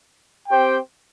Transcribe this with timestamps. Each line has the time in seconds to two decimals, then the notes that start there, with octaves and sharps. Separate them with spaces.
0.49 C4 G4 C5 G5